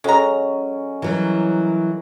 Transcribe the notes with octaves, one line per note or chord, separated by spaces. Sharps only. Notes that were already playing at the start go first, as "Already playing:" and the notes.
F#3 G#3 C#4 A4 D#5 A#5
E3 F#3 G3 A#4